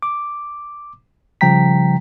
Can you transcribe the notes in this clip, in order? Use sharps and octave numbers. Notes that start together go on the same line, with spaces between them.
D6
C#3 F3 G3 G5 A#5 B6